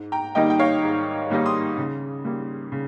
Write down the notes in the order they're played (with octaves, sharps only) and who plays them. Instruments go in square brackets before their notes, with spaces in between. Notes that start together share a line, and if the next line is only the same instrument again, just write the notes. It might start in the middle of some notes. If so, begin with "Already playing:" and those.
Already playing: [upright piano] G#2
G5 A#5
D#3 G3 A#3 D#4 D#5 G5
G5
C#5 F5
G#2
D#3 G3 A#3 D#4
C6 D#6
C#3
G3 A#3
C#3